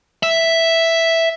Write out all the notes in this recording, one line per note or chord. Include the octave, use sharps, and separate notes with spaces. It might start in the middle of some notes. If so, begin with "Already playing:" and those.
E5